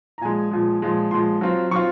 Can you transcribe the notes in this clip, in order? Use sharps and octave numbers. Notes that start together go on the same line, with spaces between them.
A#5
A#2 F3 G#3 G#5
A#2 F3 G#3
A#2 F3 G#3
A#2 F3 G#3 C6
F#3 C4 F4
F#3 C4 F4 C#6